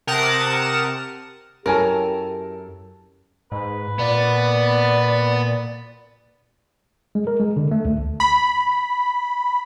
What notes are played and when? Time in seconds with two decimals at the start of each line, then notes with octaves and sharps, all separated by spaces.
0.07 C3 A#4 F#5 A5 D#6 E7
1.66 F#2 E4 G4 A4 A#4 C#5 G#5 A5
3.52 G#2 B4
3.99 A#2 B3 D5
7.15 G#3
7.27 A#4
7.40 G#3
7.57 D3
7.71 A3
7.85 D2
8.20 B5